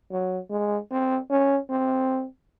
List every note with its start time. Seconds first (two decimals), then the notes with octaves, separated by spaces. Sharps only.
0.11 F#3
0.50 G#3
0.91 C4
1.30 C#4
1.70 C4